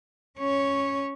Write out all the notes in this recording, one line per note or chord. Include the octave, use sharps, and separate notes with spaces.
C#4 C#5